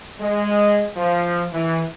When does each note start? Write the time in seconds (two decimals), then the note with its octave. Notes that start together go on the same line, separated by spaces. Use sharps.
0.20 G#3
0.96 F3
1.53 E3